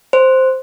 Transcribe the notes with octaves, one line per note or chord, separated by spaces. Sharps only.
C5